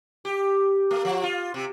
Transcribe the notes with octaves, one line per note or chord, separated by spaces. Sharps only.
G4
A3
F3
F4
C3